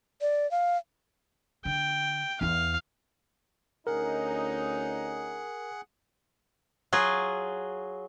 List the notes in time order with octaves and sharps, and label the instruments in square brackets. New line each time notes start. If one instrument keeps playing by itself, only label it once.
[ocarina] D5
F5
[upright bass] D3 [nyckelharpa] G5
[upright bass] E2 E4 [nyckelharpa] F5
[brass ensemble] D2 C#4 D#4 [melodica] G#4 F#5 [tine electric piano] A#4
[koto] F#3 F4 G#4